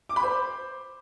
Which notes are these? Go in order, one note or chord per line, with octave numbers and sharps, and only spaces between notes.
D6
B5
C5